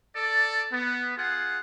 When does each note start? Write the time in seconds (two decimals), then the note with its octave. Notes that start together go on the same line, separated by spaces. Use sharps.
0.15 A4 D5
0.70 B3
1.17 F4 G#4 F#5